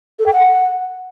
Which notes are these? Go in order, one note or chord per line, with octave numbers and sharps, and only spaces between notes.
A4
G5
F#5